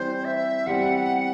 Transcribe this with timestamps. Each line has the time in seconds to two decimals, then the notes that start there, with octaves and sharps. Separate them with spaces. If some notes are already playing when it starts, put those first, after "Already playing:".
Already playing: E3 G3 C4 G4 C5
0.25 E5
0.66 E3 G3 C4 G4 F#5